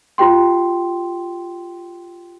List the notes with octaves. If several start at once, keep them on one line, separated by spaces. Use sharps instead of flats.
F4 G4 G5 C6